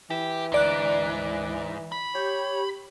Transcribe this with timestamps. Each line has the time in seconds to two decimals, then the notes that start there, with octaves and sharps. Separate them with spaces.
0.11 E3 G4
0.52 D2 G#2 D5 F#6
1.92 B5
2.15 G4 C#5